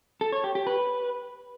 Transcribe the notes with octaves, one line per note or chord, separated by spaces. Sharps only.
A4
C#5
G4
G4
B4